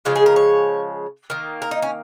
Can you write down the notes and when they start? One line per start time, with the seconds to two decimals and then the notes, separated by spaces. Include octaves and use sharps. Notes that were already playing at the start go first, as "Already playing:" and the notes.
0.05 C#3 F3 G#3 F4
0.16 G#4
0.26 A#4
0.36 C#5
1.30 D#3 A#3
1.62 A#4
1.71 D#4
1.82 C#4